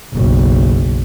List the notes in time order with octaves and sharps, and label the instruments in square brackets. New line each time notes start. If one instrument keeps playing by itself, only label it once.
[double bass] F#1 B1